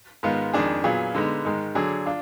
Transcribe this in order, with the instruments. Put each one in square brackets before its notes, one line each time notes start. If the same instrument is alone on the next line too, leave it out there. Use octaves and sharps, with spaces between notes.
[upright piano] G#2 D#3 G#3 B3 F4
F2 D#3 G#3 D4 G#4
A#2 F#3 B3 F4 G#4
D3 G#3 B3 D#4
G#2 D#3 G#3
D3 F#3 D4 G#4
D4 F4